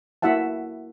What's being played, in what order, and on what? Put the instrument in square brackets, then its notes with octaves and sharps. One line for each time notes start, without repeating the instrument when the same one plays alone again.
[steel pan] A#3 E4 F#4 E5 F#5 A5